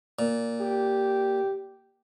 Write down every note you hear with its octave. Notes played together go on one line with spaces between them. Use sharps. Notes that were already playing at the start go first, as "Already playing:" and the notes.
A#2
G4